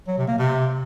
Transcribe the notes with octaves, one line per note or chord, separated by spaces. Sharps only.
F#3
C3
A#3
C3